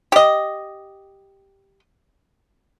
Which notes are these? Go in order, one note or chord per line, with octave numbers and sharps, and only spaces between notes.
G4 D#5